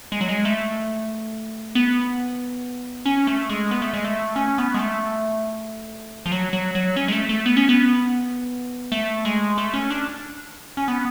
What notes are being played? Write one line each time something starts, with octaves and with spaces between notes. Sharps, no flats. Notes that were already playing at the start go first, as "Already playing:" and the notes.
G#3
F#3
G#3
A3
B3
C#4
A3
G#3
B3
A3
G#3
A3
C#4
B3
G#3
A3
F3
F#3
F#3
F#3
C#4
G#3
A3
A3
B3
C#4
B3
A3
G#3
A3
C#4
D4
C#4
B3